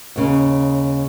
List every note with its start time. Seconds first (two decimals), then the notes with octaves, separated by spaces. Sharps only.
0.16 D#2 C#3